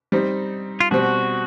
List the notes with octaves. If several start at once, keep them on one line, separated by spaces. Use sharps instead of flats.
G3 C4 D#4
F4
B2 G3 C4 F#4